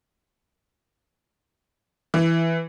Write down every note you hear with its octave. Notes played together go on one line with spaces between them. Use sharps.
E3